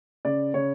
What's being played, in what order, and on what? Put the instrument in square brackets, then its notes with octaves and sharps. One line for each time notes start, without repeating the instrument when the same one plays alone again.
[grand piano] C#3 D5
C#3 C#5